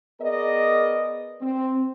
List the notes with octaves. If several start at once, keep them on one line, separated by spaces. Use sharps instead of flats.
B3 G#4 A#4 D5 D#5
C4